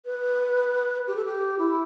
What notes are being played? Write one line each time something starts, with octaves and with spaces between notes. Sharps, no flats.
B4
G4
A4
G4
E4